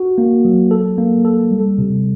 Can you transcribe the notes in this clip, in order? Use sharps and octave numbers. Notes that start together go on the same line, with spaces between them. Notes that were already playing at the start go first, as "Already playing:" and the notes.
Already playing: F#4
A#3
F#3
A4
A#3
A4
G3
C3